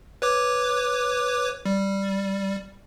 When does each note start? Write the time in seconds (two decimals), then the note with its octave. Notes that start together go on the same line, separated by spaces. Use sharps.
0.22 B4 C#5 D6
1.65 G3